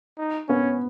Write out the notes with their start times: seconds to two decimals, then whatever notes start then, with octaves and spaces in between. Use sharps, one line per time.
0.18 D#4
0.49 B3 C#4